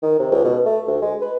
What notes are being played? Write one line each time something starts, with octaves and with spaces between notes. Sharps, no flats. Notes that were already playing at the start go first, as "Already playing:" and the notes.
D#3
C3
C#2
B2
A3
D2
G#3
B4